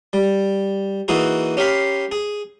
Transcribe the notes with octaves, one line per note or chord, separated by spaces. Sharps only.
G3
E3 A#3 D#4 E4 F#4 G#4
C#4 G4 A#4 F5 B5 C6
G#4